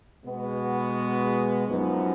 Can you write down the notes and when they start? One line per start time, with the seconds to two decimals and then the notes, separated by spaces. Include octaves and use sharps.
0.24 B2 G#3 B3 F#4
1.68 F#2 F3 B3 D#4